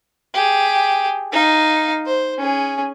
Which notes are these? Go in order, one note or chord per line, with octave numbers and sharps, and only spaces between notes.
G4 G#4
D#4 F5
C5
C#4 G#4